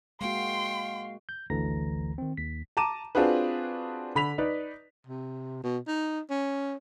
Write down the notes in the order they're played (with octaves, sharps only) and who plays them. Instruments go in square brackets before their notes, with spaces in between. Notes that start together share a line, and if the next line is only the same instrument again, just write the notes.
[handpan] G#3 A#3 F#4 [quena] F5 [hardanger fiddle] G5 [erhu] C6
[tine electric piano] G6
G#1 D2 D3 E3 A#5 A#6
D#3 C4
D#2 B6
[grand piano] A5 A#5 D6 D#7 E7
C4 D4 F4 F#4 G#4 B4
D3 B5 B6 F7
D#4 B4 D5
[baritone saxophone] C3
B2
D#4
C#4